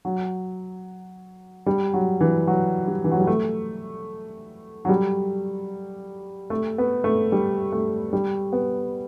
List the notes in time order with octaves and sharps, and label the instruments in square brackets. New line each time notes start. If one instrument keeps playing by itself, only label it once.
[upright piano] F#3
G3
F#3
E3
F#3
G3
E3
F#3
G3
A3
F#3
G3
A3
B3
A3
G3
A3
G3
B3